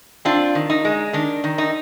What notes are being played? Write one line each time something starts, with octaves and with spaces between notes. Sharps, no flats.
C4 D4 F4
D#3
D#4
G#3
D#3 D4
D#3
D#4